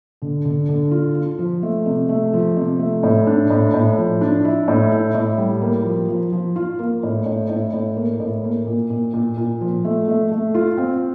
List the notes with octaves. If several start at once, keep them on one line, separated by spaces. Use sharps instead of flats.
D3
D3
D3
F4
F4
F3
A3
C3
A3
F3
C3
A3
A2
D4
A2
A2
F3
D4
E4
A2
E4
A2
G3
A#3
F3
F3
F3
F4
A#3
A2
A2
A2
A2
A#3
A2
A#3
A#2
A#2
A#2
A#2
F3
A3
A3
A3
F4
C4